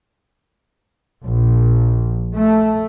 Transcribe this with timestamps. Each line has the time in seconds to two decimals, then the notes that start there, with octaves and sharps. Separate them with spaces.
1.24 A#1
2.38 A3